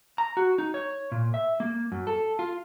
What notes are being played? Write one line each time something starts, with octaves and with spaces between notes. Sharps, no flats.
A#5
F#4
D#4
C#5
A#2
E5
A#3
F#2
A4
F4